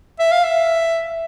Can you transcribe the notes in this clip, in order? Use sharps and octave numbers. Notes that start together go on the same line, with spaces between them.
E5
F5
E5